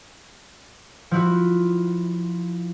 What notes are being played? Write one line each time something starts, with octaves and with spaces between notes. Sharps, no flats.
F3 E4 F#4